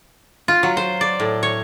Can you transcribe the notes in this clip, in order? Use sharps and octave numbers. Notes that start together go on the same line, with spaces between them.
F4
F#3
C5
D5
A2
C#5